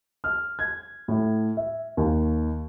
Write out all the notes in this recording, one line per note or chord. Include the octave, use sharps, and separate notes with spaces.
F6
G#6
A2
E5
D#2